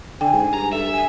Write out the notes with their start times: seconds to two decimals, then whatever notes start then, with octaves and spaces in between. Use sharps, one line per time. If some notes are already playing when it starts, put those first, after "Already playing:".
0.21 D3 G5 G#5
0.34 G#2
0.54 G2 A#5
0.72 A4 E5
0.92 G#5